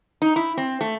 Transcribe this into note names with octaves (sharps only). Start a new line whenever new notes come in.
D#4
E4
C4
A3